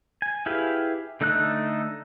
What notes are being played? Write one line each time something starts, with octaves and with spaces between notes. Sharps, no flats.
G#5
E4 G4 G#4 B4 F5
D3 A3 D#4 A4 F#6